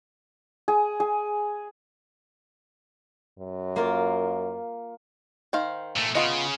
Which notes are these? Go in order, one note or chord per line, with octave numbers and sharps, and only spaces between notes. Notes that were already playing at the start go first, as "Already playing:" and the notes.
G#4
G#4
F#2
A#3 F4
D#3 C5 F5
A#2 A3
C#3 B3 F4 D#5